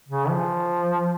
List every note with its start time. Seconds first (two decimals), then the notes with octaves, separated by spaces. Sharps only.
0.08 C#3
0.29 F3